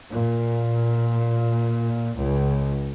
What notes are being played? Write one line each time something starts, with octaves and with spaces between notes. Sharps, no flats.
A#2
C#2